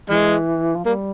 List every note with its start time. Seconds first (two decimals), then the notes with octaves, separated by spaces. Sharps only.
0.09 E3 G#3
0.75 F3
0.85 G3 A#3